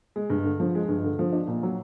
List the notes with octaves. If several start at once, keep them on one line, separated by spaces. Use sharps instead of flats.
G#3
G2
D3
F3
G#3
G2
D3
F3
D4
A#2
F#3